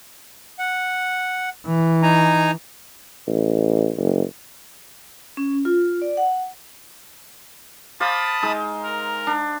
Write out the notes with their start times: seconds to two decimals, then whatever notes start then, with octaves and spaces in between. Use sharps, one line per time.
0.59 F#5
1.67 E3
2.03 D#4 G#5 A#5
3.27 A1
3.97 F#1
5.37 C#4
5.65 F4
6.02 D5
6.17 F#5
8.00 C5 D5 F5 A5 B5 D#6
8.43 G#3 D#4
8.82 A#4
9.27 D4